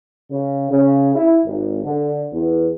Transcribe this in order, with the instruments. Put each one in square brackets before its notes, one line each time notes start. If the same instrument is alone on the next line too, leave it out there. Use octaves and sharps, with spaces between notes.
[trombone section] C#3
C#3
E4
G#1
D3
E2